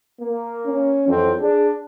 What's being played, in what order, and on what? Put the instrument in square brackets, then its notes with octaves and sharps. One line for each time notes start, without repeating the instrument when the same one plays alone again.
[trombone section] A#3
[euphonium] C#4
[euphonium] F2 [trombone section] E3 F#3 C4
[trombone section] D4 [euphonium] G#4